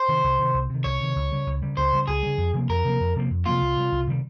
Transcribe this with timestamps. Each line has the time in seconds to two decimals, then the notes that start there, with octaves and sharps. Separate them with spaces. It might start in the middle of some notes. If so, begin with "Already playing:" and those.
Already playing: C5
0.08 C3 D#3
0.24 C2
0.39 C3 D#3
0.54 C2
0.70 C3 D#3
0.84 C2 C#5
1.01 C3 D#3
1.16 C#2
1.32 C#3 G3
1.47 C#2
1.62 C#3 G3
1.77 C#2 C5
1.93 C#3 G3
2.08 C#2 G#4
2.23 C#3 G3
2.38 F2
2.54 C3 F3 A#3
2.69 F2 A#4
2.85 C3 F3 A#3
3.00 F2
3.16 C3 F3 A#3
3.31 F2
3.46 C3 F3 A#3 F4
3.61 C2
3.77 C3 D#3 G3
3.92 C2
4.07 C3 D#3 G3